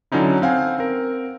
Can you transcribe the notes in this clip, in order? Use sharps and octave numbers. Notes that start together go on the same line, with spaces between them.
D3 F#3 C#4 D#4 E4
C4 F5 F#5 G#5
C4 A#4